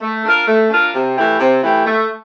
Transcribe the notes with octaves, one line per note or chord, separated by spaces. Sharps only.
A3
D4 F4 A#4
A3
D4 F4 A#4
C3
E3 A3 E4 G4
C3
E3 A3 E4 G4
A3